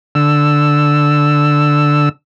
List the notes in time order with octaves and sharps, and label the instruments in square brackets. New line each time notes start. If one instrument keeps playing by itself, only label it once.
[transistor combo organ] D3 E6